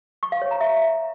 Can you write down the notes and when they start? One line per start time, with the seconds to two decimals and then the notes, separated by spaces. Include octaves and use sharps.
0.23 C#6
0.32 F5
0.42 C#5
0.51 A#5
0.61 E5